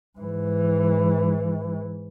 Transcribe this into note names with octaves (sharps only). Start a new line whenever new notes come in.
G#2 E3